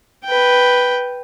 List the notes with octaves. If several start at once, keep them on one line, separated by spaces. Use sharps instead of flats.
B4 G5